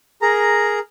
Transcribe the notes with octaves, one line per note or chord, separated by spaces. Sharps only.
G#4 A#4 A#5